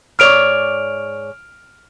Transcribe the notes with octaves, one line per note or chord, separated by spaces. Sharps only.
G#2 C#5 D5 F6 D7 F7